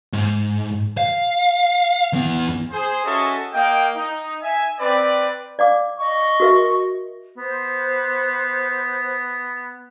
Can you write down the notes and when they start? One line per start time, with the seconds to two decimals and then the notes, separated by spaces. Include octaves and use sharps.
0.13 G#2
0.97 F5
2.13 E2 B3
2.72 G#4 C5
3.05 C#4 F#4 G#4 A4 D#5 E5
3.53 A#3 D#5 G5
3.96 D#4
4.42 E5 G#5
4.80 C4 B4 D5
5.59 D5 F5 D6
5.99 D#5 C#6
6.40 F#4 A#4 E5
7.37 B3 C5